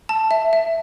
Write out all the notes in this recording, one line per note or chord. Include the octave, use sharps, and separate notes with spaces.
A5
E5
E5